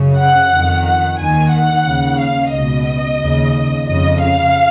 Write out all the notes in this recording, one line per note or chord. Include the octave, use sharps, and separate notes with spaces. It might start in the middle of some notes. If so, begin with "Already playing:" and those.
Already playing: F#2 C#3
F#5
F2 D#3
F#5
D#2 D#3 G#5
F#5
D#2 C#3
F5
C#2 B2 D#5
D#2 C#3
F2 C#3 D#5
F5